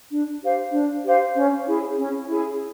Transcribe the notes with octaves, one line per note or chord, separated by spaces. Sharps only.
D4
G4 C5 F5
D4
G4 C5 F5
C#4
E4 G#4
C#4
E4 G#4